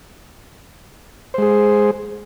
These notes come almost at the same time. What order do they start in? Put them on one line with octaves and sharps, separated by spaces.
C5 G#3 G#4